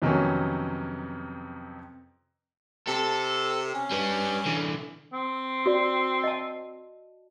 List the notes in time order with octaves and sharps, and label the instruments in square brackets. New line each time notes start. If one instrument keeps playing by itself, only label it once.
[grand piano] F2 C3 D#3 F#3 B3 C#4
[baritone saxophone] C3 [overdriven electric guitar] A4
[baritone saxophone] C#4
[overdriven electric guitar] G3 B4
D3 E3
[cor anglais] C4
[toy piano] F#4 D5
D#5 A5